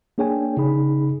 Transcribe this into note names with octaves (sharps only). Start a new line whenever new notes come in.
A#3 D4 G#4 C#5 G5 G#5
C#3 D#4 G#4 B5